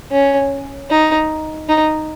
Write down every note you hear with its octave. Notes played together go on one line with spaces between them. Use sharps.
C#4
D#4
D#4